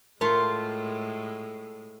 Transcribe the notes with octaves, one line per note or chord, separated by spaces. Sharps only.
A2 G#3 A3 F4 A#4 C6